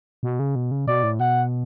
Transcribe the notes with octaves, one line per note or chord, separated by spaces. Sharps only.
B2
C#3
B2
C#3
B2 D5
A2
B2 F#5